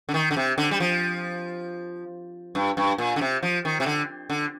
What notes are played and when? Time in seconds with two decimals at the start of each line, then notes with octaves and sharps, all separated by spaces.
0.09 D3
0.14 D#3
0.31 D3
0.37 C3
0.58 D3
0.71 G3
0.80 F3
2.55 G2
2.77 G2
2.98 A#2
3.16 D3
3.21 C3
3.43 F3
3.65 D#3
3.80 C3
3.86 D3
4.30 D3